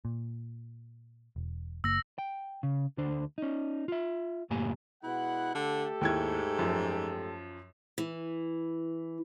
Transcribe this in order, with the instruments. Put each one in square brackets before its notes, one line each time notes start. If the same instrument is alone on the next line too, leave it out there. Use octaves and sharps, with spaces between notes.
[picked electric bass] A#2
E1
[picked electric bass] F#1 A#3 [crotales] E6 A#6
[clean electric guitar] G5
C#3
D2 D3 D4 C5
C#4 D#4
F4 E5
C#2 F#2 A2 A#3 G4 G#5
[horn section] B2 G#3 F#5 [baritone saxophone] E4
[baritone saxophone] D3 [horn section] A3 G4 A4
[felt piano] D#2 E4 G#6 [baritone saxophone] G#2
[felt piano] F#2 F3
[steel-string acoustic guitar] E3